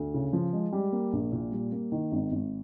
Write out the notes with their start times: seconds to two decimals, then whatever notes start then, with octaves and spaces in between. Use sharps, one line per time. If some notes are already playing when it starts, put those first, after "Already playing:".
Already playing: D2
0.14 C#3
0.33 F3
0.53 G#3
0.72 G3
0.93 A#3
1.13 A#1
1.32 A#2
1.52 G3
1.72 A#3
1.92 D#3
2.12 G#1
2.32 G#1